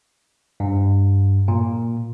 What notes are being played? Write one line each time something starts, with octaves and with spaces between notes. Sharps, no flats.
G2
A#2